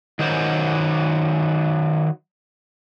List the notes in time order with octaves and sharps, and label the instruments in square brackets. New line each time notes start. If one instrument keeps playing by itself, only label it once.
[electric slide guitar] D#3 F#3 C5